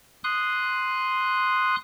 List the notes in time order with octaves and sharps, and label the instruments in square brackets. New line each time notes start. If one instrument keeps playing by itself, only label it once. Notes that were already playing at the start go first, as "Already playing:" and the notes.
[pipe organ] C6 D#6 F#6